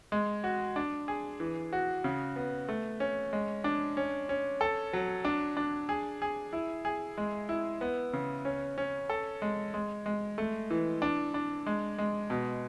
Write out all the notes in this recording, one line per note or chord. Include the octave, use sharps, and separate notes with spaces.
G#3
F#4
D4
G#4
E3
F#4
C#3
B3
A3
C#4
G#3
D4
C#4
C#4
A4
F#3
D4
D4
G#4
G#4
E4
G#4
G#3
E4
B3
C#3
C#4
C#4
A4
G#3
G#3
G#3
A3
E3
D4
D4
G#3
G#3
B2